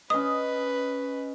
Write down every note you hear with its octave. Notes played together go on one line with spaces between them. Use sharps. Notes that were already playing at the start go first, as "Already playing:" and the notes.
C#4 B4 D#5 D#6